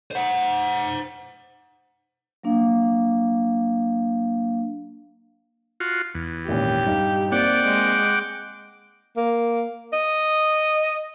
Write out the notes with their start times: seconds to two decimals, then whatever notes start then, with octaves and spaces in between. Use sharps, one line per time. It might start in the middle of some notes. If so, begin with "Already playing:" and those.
0.11 C5 F#5
2.43 F#3 A#3 D4 F5
5.80 F4 F#4
6.14 E2
6.48 G#1 A#2 C#4 G4
6.86 G2 D#4 F5
7.32 A#3 C4 D#4 D5 F#5 G5 D6
7.67 G#3
9.17 A#3
9.93 D#5